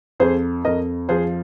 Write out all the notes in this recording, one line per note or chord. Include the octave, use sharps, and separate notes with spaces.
F2 G#4 C5
F2 A#4 D#5
F3 G#4 C5